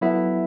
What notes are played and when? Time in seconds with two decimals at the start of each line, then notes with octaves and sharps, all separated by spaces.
0.01 F#3 B3 E4 A4 E5